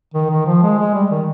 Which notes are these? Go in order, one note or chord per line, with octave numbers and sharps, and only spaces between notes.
D#3
D#3
F3
G#3
G#3
G3
D#3